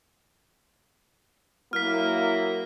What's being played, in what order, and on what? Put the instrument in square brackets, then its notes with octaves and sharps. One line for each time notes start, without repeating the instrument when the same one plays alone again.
[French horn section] F#3 A#3 E4 [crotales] F6 B6